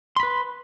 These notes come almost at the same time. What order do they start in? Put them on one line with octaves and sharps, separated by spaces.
C6 B5 B4